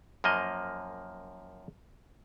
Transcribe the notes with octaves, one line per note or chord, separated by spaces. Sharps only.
F#2 F3 A#3 D#5